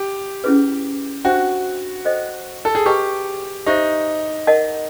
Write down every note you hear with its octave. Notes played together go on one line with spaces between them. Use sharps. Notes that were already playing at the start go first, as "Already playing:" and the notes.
Already playing: G4
C#4 E4 G#4 B4
D4 F#4 G4 C5 E5 G5
A4 C5 D#5 G5
A4
G#4
G4 B4 D#5 G5 A#5 C#6
D#4 G4 C5 E5
A#4 D#5 F#5 A5